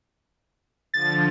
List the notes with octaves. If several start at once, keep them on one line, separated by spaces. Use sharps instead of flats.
D3 F3 A6